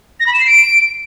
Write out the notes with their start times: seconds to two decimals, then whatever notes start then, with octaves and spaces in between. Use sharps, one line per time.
0.20 A#6
0.27 B5
0.33 E7
0.40 C7
0.47 D7